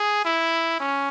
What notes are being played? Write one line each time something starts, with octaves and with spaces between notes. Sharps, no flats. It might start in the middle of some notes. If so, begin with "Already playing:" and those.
Already playing: G#4
E4
C#4